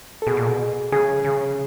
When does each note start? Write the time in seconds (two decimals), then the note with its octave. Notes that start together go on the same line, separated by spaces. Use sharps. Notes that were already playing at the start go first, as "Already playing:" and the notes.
0.22 A4
0.27 B2 G#4
0.37 A#2
0.48 B2
0.92 C#3 G#4
1.24 C#3